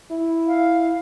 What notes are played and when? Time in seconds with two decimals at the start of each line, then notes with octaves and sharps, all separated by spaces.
0.11 E4
0.47 F5